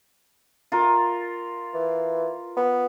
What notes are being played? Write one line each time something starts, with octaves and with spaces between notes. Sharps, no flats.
F4 A#4
E3
B3